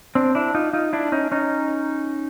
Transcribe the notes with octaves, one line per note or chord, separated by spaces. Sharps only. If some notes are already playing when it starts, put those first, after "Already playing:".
C4 D4
D4 E4
D#4 F4
D#4 F4
D4 E4
C#4 D#4
C#4 D#4